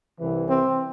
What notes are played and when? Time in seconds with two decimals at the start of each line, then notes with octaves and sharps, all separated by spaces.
0.19 C2 C3 E3
0.49 C4